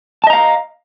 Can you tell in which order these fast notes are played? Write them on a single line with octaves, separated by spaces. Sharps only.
A5 D#5 A#5 F5